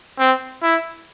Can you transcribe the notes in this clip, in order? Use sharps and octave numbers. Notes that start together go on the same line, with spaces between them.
C4
E4